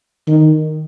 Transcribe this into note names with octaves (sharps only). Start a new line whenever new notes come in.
D#3